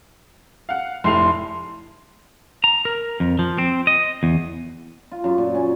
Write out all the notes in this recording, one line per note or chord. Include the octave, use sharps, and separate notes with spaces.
F5 F#5
F1 A2 C6 C7 F7
A#5
A#4
F2
F3
C4
D#5
E2
F4
F#2
A#2
C#4